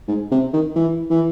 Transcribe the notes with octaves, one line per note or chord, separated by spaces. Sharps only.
G#2
C3
D#3
E3
E3